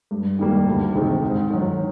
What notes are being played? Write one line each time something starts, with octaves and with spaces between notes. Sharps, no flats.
G2
D#3 G3 A#3
D2
C3 D#3 G#3 C4
G#2
D#3 F#3